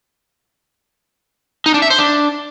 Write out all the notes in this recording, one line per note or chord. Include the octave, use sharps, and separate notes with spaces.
D#4
D4
E5
C5
D4